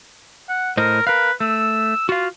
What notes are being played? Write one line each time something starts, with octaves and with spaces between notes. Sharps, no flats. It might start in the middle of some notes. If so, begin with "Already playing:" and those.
F#5
A2 A#4 C5 D#5
A#4 B4 F5
A3 E6
F4 F#4 F5